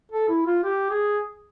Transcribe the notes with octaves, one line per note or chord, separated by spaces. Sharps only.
A4
E4
F4
G4
G#4